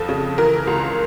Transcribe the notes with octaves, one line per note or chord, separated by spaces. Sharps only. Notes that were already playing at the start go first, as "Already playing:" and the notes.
Already playing: F2 F3 A4
C#3
E3 A#4
C#2